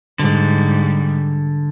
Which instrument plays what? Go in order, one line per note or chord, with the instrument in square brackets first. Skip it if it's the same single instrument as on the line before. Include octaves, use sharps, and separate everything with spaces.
[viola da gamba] G#2 G3 [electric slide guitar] D3